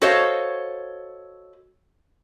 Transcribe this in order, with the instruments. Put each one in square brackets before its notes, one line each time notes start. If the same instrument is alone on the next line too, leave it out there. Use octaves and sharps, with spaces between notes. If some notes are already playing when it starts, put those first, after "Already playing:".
[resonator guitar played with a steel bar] F#4 A4 C5 C#5 D#5 F5